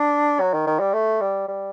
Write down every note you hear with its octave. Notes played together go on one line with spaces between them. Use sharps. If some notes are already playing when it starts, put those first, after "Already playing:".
Already playing: D4
F#3
D#3
D#3
G3
A3
G3
G3